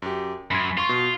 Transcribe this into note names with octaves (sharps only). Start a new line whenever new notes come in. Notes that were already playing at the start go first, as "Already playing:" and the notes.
F#2 G4
F#2 B5 C6 G#6
F4 C6 C#6
B2